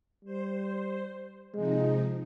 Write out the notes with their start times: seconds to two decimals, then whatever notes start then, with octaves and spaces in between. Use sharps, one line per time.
0.25 G3 C5
1.55 C3 F3 G#3 D#4